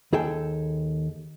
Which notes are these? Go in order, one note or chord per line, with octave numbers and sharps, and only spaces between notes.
D#2 G#4 A4 G5